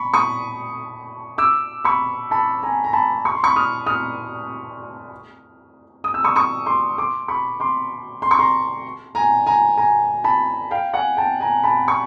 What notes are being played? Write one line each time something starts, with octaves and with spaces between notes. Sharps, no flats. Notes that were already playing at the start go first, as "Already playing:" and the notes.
Already playing: B5 C#6
C#6 D#6
D6 E6
B5 C#6
A5 B5
G#5 A#5
A#5
A5 B5
C#6
C6
B5 C#6
D#6 F6
D#6 F6
D#6
E6
C#6 D#6
C#6 D#6
C6 D6
C6 D6
B5 C#6
C6 D6
C6
C#6
A#5 C6
G#5 A#5
G#5 A#5
G#5 A#5
A5 B5
F5 G5
F#5 G#5
G5 A5
G#5 A#5
A5 B5
C#6